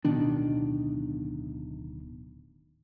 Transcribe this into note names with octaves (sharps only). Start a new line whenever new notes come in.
D1 B2 D#3 D4